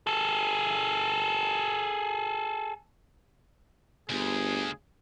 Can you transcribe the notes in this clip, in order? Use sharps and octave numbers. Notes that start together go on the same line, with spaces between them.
G#4 A4
G1 D2 G#4